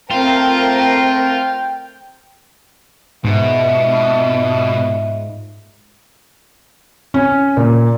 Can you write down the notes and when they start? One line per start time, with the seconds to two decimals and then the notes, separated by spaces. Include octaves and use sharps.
0.11 A3 C4 F4 A#4 G5
3.24 G#2 B2 F4 D#5 E5
7.14 C#4
7.57 A#2